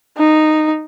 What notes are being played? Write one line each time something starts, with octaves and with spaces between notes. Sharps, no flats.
D#4